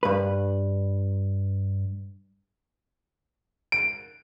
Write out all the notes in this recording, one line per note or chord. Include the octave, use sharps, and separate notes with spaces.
G2 B4
D7